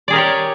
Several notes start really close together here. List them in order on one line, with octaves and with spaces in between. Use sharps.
D5 G#4 A#4 G4 C#5